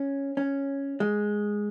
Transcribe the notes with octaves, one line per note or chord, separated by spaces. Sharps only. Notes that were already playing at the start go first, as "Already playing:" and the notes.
Already playing: C#4
C#4
G#3